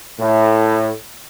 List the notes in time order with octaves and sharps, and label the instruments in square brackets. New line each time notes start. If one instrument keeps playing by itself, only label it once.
[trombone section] A2